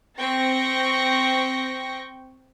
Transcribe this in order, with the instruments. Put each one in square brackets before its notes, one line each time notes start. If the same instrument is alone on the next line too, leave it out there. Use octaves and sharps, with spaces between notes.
[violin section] C4 G5 C#6 A#6